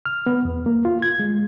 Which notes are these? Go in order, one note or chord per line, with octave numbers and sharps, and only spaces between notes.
F6
B3
E2
A#3
F4
G#6
G#3